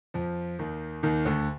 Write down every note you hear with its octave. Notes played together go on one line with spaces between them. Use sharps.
F2 F3
D#2 D#3
D#2 D#3
D2 D3